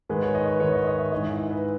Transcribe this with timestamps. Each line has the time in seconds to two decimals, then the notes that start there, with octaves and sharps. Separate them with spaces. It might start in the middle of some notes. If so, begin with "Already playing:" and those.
0.09 G#2 D#3 G#3 B4
0.23 C#5
0.35 D#5
0.47 B4
0.60 G#2 D#3 G#3 C#5
0.73 D#5
0.87 D#5
0.99 E5
1.12 G#2 E3 G#3 D#5
1.25 E5
1.38 E5
1.51 B4